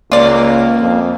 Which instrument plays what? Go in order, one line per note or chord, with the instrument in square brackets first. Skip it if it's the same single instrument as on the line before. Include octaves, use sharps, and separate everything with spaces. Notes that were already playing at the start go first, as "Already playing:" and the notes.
[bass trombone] C#2 [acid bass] A#3 [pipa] F4 D5
[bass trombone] F2